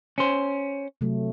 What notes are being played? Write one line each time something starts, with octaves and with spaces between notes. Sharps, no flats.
C#4 C5
C3 F#3 A3